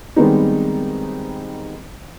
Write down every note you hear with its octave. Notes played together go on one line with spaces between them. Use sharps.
D#3 G3 G#3 B3 C4 D#4